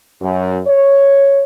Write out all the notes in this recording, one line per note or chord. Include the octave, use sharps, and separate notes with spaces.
F#2
C#5